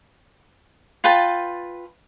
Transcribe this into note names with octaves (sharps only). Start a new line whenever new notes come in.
F4 B4 G5 A5